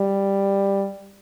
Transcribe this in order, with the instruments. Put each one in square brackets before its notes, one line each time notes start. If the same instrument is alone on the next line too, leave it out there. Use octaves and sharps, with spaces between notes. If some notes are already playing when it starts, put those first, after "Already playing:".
Already playing: [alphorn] G3